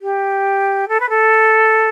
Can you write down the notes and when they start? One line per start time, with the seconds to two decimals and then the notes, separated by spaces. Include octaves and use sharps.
0.01 G4
0.88 A4
1.00 B4
1.09 A4